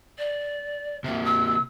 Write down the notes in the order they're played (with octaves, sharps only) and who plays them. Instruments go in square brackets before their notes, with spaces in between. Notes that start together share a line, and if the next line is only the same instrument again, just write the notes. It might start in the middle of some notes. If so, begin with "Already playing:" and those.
[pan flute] D5
[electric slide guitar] C3 A#3 [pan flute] E5
[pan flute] E6